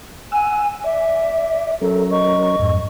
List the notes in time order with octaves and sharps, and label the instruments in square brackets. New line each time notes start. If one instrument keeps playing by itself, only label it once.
[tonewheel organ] F#5 E6 [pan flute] G#5
[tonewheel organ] D5 [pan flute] E5
[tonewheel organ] F#3 C#4 A#4 [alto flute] A4
[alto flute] D#5 [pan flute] C#6
[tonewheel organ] F2 G#2